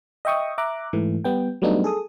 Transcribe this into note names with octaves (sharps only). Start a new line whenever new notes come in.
D#5 E5 G5 C#6 D#6
E5 A#5 D6 F#6
G#2 E3 A3
G3 B3 G5
F#3 G3 A3 B3 D4 D#4
G#4 A4 D#6